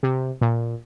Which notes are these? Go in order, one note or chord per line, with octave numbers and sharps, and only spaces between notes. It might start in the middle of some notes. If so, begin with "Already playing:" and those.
C3
A#2